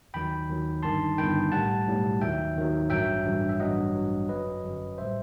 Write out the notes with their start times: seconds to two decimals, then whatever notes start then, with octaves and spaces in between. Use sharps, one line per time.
0.14 D#2 D#3 F#3 G5 B5
0.49 D#2 D#3 F#3
0.83 G1 G2 D#3 A5 C6
1.18 G1 G2 D#3 G5 B5
1.52 B1 A2 G3 F#5 A5
1.87 B1 A2 G3
2.21 D#2 D#3 F#3 E5 G5
2.56 D#2 D#3 F#3
2.90 A1 G2 F#3 E5 G5
3.24 A1 G2 F#3
3.49 E5
3.60 A1 G2 F#3 D#5 F#5
3.95 A1 G2 F#3
4.28 G1 F#2 F#3 B4 D#5
4.63 G1 F#2 F#3
4.97 A1 A2 G3 C5 E5